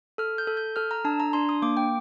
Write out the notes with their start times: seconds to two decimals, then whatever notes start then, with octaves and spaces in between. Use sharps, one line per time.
0.18 A4 F6
0.38 G6
0.47 A4
0.57 G6
0.76 A4 F6
0.91 A#5
1.05 D4 A5
1.20 A#5
1.33 D4 C6
1.49 D#6
1.62 A#3 D6
1.77 G5